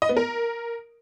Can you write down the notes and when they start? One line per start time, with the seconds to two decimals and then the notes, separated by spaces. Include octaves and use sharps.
0.02 D#5
0.09 B3
0.17 A#4